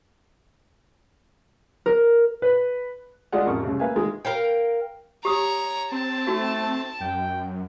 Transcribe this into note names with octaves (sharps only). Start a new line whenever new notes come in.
A#4
B4
G#3 F4 D5 D#5 F#5
A1 F2 A#4 C#6
C2 C#3
A#3 B4 E5 F5 G#5
D#3 G#3
A#4 F5 G5
G4 C#5 A#5 D#6
C4 A5
A3 D#4 F#4
F#2 G5